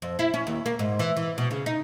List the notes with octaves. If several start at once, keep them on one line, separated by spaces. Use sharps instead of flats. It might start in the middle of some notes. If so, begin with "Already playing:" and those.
F2
E4
C#4
D#2
A#3
G#2
E3
E3
B2
C#3
D#4